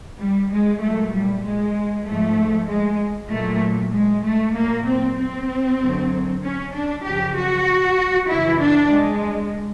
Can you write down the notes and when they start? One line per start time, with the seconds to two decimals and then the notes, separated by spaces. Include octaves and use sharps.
0.19 G3
0.50 G#3
0.81 A#2 F#3 A3
1.12 G3
1.44 G#3
2.05 G#2 F3 A3
2.67 G#3
3.30 A#2 F#3 A3
3.93 G#3
4.24 A3
4.55 A#2 F#3 A#3
4.87 C4
5.18 C4
5.80 F#2 D3 F#3
6.43 C#4
6.74 D4
7.04 F#2 C#3 F3 G4
7.36 F#4
8.29 F#2 C#3 E3 E4
8.60 D4
8.92 G#3